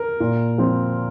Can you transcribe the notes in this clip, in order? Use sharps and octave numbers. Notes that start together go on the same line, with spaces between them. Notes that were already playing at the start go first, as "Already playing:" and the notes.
Already playing: A#4
A#2
F3 C4